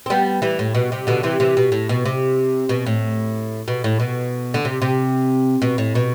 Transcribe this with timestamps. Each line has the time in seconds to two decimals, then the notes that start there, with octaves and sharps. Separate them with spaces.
0.06 C4
0.10 G3 B3
0.42 E3 G3
0.59 A2
0.75 B2
0.92 C3
1.07 B2 D3
1.23 C3 E3
1.40 C3 E3
1.57 B2
1.72 A2
1.89 B2
2.06 C3
2.69 B2
2.86 A2
3.68 B2
3.84 A2
4.00 B2
4.54 D3
4.65 C3
4.82 C3
5.62 B2
5.78 A2
5.95 B2